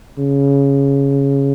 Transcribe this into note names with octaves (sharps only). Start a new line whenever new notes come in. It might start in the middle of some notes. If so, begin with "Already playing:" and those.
C#3